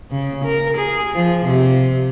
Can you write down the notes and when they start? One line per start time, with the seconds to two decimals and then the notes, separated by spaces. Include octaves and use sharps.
0.11 C#3
0.45 A#4
0.77 G#4
1.14 F3
1.46 C3